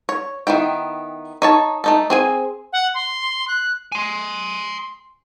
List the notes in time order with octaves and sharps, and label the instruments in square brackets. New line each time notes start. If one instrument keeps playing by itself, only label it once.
[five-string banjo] C#5
D#3 B3 E4 G5
D#4 C#5 A5
A3 D#4 A4
C4 G#4 G#5
[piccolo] F#5
C6
F#6
[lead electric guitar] G#5 C6